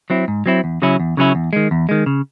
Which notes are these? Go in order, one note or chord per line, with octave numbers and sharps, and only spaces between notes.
F#3 C4 E4
G#2
F#3 C4 E4
E2
C#3 F#3 C#4 E4
E2
C#3 F#3 C#4 E4
E2
D#3 G#3
E2
D#3 G#3
C#3